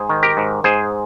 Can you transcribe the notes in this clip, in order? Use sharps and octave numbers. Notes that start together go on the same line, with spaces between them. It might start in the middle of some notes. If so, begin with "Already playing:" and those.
Already playing: G#2 G#4 C5
D#3
G4 A#4
G#2
G#2 G#4 C5